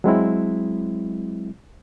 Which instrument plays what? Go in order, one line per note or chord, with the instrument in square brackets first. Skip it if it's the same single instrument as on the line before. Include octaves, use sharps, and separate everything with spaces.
[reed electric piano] F#3 G#3 C4 E4